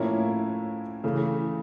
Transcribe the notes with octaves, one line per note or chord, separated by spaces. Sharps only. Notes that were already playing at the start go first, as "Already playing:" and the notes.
Already playing: A2 F3 A#3 C#4 E4
C#3 E3 A3